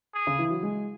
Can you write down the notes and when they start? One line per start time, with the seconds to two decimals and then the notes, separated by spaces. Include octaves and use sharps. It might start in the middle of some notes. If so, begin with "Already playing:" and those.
0.15 G#4
0.27 C#3
0.39 E3
0.50 F#3
0.63 G#3